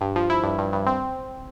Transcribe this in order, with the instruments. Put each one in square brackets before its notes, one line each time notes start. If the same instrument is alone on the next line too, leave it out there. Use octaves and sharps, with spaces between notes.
[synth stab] G2
F3
E4
G2
G2
G2
C4